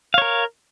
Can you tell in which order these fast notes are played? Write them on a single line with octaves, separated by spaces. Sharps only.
F5 C#5 A#4